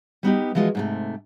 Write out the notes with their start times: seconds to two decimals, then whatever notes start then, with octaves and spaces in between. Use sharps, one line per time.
0.23 G3 B3 D#4 G4
0.55 E3 F3 G#3 F4 F#4
0.75 G#2 C3 A3